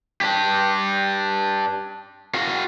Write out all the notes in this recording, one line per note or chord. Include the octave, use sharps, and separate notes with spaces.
D4 G4
F#4 F5